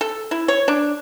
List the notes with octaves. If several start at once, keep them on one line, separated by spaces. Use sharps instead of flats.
A4
E4
C#5
D4